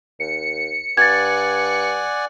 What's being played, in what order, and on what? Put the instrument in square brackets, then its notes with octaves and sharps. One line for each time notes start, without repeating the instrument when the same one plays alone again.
[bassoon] D#2 [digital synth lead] C#7
[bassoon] G2 [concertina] D5 F#5 G#5 [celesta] G#6 A6